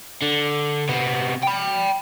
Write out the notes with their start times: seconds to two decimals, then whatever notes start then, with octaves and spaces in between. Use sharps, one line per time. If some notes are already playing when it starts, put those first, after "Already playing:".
0.22 D3
0.89 C3 B3
1.43 G5 B5